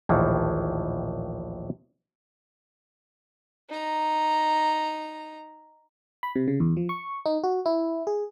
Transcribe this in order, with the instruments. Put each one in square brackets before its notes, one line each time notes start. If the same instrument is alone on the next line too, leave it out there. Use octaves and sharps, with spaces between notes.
[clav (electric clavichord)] A#1 D#2 A2 D#3 E3
[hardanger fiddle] D#4 A#5
[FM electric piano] B5
C3
C#3
E2
F3
C#6
D#4
F#4
E4
G#4